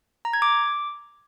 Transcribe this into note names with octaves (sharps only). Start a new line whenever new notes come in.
A#5
G#6
D6